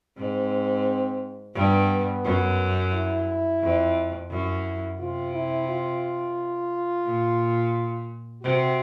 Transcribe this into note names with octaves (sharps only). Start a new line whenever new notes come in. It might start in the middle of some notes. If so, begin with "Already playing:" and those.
G#2 C4
G2 B3
F#2
E4
F2
F#2 E4
C3 F4
E4
F4
A#2
C3 F#4